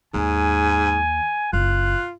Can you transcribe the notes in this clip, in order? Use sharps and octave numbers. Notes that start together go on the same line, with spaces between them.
D#2 G#2 G#5
F#1 F4 F#6